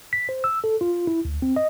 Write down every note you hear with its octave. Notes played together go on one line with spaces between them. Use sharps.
B6
C5
E6
A4
F4
E4
D2
C4
D#5